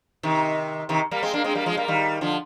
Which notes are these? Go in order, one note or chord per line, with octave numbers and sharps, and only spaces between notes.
C3 D#3
C3 D#3
G3 A#3
G#3 C4
A#3 D4
G#3 C4
G3 A#3
F3 G#3
G3 A#3
D#3 G3
D3 F3